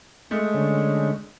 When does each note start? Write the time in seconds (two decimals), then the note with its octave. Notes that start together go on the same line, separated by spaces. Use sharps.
0.31 G#3 A3
0.54 D3 C#4